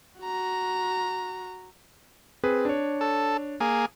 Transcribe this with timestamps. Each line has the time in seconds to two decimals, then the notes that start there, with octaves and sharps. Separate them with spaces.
0.20 F#4 A#5
2.43 C4 G#4 B4
2.65 D4 C#5
3.01 A4
3.60 A#3 G#4